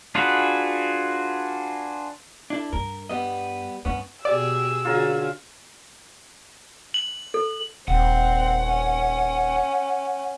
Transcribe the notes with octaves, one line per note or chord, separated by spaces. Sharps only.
D4 F4 F#4 G#4 B4
D4 E4 A4
G2 A#4
G3 B3 D#5
G2 B3 C#4
B2 G4 G#4 D5 E6
D3 C#4 F4 F#4 G#4 A#4
F#7
A4
D#1 C4 F#5
C#4